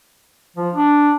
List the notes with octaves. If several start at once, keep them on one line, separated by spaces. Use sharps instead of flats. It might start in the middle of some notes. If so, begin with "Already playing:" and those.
F3
D4